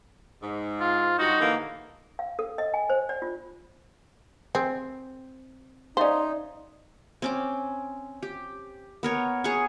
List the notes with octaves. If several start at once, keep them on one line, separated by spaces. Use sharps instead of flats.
G#2
F4
G2 D#4 F#4
D3 E3 A#3
F5
A4
D#5
G#5
C5
D5
F4
C4 G#4
C#4 D#4 C5 D5 E5 F5
C4 C#4 D6
G4
B3 A#4 C#5
G#4 C#5 F#5 C#6